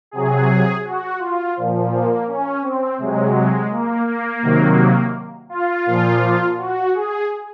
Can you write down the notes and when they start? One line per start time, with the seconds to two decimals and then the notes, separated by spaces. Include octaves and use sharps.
0.11 C3 F#3 G#4
0.84 F#4
1.19 F4
1.56 A#2 F3
1.91 A#3
2.27 C#4
2.63 C4
2.98 C3 F#3 G#3
3.35 G#3
3.71 A#3
4.07 A#3
4.43 C3 D#3 F#3
5.49 F4
5.86 A#2 F3
6.58 F#4
6.94 G#4